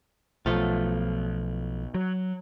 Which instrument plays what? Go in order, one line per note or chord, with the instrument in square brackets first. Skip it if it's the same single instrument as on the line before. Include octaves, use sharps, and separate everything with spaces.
[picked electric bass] B1 [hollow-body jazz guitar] F3 A3 F4
[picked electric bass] F#3